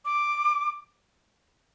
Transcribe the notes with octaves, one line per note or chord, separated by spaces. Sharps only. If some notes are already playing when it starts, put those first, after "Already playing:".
D6